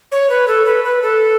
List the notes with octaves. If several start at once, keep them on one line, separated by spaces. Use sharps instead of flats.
C#5
B4
A4
B4
B4
A4